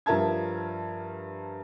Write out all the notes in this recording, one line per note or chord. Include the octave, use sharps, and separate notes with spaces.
G2 F3 A#4 E5 A5 G#6